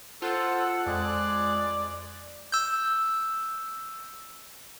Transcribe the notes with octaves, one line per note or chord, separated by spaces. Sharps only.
F4 A4 C5 F#5 A5 E6
F2 G#3 G#4 D5 F#6
E6 G6